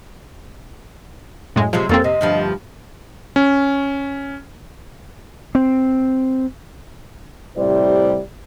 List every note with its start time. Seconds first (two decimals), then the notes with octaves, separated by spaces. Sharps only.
1.56 F#2 A2 G#3
1.73 C3 F3 F#3 G#3
1.89 F2 A#3 C4 C#4 A4
2.04 C3 D#5
2.21 D2 G2 F3
3.36 C#4
5.55 C4
7.57 A2 C3 G3 E4 C5 D5